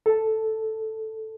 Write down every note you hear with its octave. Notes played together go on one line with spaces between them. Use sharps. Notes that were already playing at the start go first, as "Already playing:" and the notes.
A4